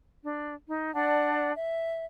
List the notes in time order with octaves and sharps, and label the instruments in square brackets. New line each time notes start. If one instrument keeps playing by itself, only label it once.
[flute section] D4
D#4
D4 D5 F#5 A5
E5